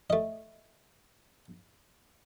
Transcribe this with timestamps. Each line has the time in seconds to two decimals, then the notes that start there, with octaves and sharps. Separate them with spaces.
0.10 A3 D#5